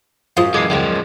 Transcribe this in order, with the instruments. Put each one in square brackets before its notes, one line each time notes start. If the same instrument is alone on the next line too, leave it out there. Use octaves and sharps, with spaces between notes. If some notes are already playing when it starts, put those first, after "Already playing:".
[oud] F#2 [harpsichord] F3 G#3 F4 [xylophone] F5 D#6
[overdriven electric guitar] E3 G#3 [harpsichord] A4 [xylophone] D6 G#6 C7
[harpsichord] D#2 D3 G3 [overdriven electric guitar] F3 G#3